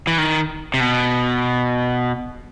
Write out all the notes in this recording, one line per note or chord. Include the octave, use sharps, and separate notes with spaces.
E3
D#3
C3
B2